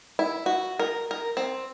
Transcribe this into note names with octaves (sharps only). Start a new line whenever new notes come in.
E4
F#4
A#4
A#4
C4